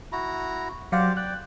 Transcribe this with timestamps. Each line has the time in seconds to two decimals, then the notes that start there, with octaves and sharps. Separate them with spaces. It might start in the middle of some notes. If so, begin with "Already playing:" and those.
0.12 E4 F#4 A#5
0.92 F#3 G4 C5 D5 F5 F#5
1.17 D5 G5 F#6